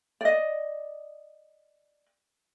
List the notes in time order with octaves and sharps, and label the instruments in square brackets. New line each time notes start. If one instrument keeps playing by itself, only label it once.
[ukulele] D5 D#5